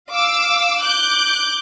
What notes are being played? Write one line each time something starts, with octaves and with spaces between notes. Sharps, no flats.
F5 D6 E6
D6 F#6 G6